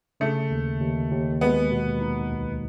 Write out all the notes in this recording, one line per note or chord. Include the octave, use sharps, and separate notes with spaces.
C#3 A3
D#2
D#2
D#2
G#3 B3
B2
D#4
C#2